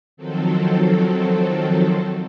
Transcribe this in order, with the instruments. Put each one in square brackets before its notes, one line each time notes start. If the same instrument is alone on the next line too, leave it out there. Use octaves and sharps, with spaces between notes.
[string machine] D#3 F3 F#3 C4 A4